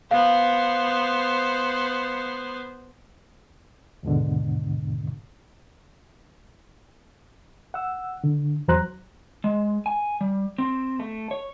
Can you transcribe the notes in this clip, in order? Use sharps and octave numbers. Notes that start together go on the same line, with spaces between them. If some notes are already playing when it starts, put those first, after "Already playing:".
B3 C5 F5
D#2 G#2 B2 D3
F#5 E6
D3
E2 F#3 C5 A#5 F#6
G#3
G#5
G3
C4
A3
C#5